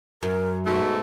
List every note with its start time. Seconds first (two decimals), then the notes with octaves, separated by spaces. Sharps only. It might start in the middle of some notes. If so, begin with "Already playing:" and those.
0.23 F#2 A#4
0.66 G#2 B2 A3 F#4